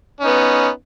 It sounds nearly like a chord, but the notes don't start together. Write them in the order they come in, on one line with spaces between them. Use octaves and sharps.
C#4 D#4 B3